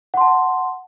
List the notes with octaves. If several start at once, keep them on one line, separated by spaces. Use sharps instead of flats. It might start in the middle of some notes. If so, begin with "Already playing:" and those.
F#5 A5 C6